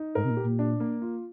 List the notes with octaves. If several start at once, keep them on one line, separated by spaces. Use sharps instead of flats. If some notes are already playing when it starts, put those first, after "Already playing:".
Already playing: D#4
G#2 A#4
C3
A#2
G4
A#2
D4
A#3
F4